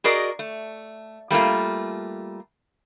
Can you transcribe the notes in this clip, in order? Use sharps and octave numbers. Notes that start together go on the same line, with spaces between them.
F#4 G#4 A#4 D5 D#5
A3
G3 A3 A#3 F4